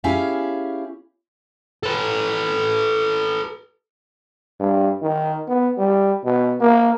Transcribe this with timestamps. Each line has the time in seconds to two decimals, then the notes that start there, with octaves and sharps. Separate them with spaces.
0.04 C#4 E4 G4 G#4 E5 F5
1.83 A4 B4
4.60 G2
5.02 D#3
5.48 B3
5.78 G3
6.24 B2
6.61 A#3